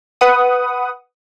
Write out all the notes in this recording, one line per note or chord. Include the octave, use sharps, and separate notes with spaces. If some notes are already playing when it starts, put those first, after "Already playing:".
B4 F#5 D#6